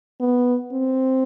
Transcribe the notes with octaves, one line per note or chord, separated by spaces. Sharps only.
B3
C4